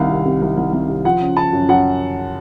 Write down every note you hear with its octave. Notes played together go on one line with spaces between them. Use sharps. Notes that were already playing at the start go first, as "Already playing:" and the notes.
Already playing: C2 D#3 F5
C3
C3
C2
C2
C2
C3
F3 F#5
C#3
C#3 A5
F#2
F#2 F#5